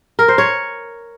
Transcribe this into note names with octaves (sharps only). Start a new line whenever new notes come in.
A#4
C5
C#5